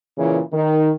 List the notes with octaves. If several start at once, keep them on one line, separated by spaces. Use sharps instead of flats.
A#2 C#3 E3
D#3